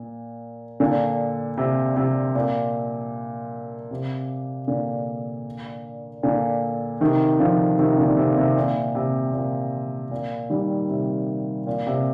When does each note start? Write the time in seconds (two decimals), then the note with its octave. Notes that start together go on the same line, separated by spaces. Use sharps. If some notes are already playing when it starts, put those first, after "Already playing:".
Already playing: A#2
0.80 A#2 D3
1.57 C3
1.96 C3
2.35 A#2
3.91 C3
4.67 A#2 D3
6.23 A#2 D3
7.01 C3 D#3
7.39 D3 F3
7.79 C3 D#3
7.98 A#2 D3
8.17 C3
8.37 C3
8.56 A#2
8.95 C3
9.33 A#2
10.11 A#2
10.50 D#3 G3
10.89 C3
11.67 A#2
11.87 C3